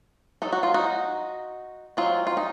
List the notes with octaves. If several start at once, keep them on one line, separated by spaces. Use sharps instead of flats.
F#3 A3 D#4 A4
F#4
F4
D#4 F#4
F#3 C4 D#4 F4
F4
D#4